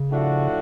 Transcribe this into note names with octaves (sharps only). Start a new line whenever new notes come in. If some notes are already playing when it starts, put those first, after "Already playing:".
Already playing: C#3
A2 F3 A3 D4 F#4